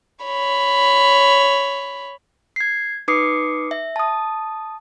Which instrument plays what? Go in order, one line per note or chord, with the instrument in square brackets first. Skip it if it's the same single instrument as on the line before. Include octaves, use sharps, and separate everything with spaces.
[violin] C#5 B5
[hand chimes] G#6 C7
D#4 B4 D6 D#6 C7 C#7
E5
A5 D#6